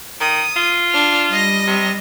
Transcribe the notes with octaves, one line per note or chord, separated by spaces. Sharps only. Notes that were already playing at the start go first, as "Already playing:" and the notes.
D#3 D#6
F4
D4 F6
G3 D#5 A#6
C3